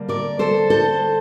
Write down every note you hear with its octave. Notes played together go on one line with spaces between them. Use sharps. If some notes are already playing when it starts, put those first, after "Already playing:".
Already playing: D3 G3 A#3
A#4 D5
A4 C5
A4 C5